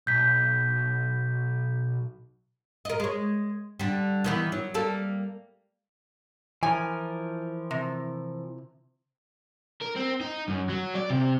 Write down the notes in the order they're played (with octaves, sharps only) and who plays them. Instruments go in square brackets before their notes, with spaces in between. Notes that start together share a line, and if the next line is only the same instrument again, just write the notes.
[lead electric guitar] B1 [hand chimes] G6 B6
[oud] A#4 D#5
G#3 C#5
D3 G3
D#3 E3 B3
F#3
G3 A#3 A4
[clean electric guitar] E3 F3 A#4 [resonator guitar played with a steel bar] G#5
[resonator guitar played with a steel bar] C3
[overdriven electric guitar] A#4
C4
D#4
F#2
F#3
D5
C3